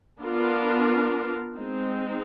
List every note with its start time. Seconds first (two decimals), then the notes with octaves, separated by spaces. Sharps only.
0.21 B3 D4 F4 A#4
1.57 G#3 C4 D#4